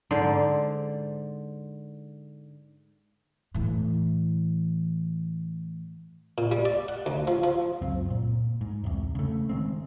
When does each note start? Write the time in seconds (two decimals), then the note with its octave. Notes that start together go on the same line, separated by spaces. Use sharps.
0.11 G#2 D3 C5 D5
3.54 A2 E3
6.38 A#2
6.51 G3
6.65 D5
6.88 F#5
7.06 D2
7.27 F3
7.44 F3
7.82 C#2 F#2 C4
8.10 A#2
8.61 G#2
8.84 E1 C2
9.15 C#3 A3
9.49 D#3 G#3 C4